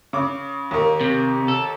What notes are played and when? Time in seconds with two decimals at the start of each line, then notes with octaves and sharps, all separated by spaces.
0.13 C#3 D6
0.71 D#2 A#3
1.01 C3
1.48 A4